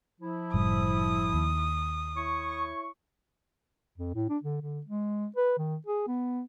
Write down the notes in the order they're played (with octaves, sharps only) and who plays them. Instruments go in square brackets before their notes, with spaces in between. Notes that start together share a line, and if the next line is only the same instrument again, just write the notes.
[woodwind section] F3 E4
[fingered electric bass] F#1 A2 G3 [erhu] D#6
[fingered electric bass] D#2
[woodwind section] E4 C#5 C#6
[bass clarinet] F2
A2
D4
D3
D3
G#3
B4
D#3
G#4
B3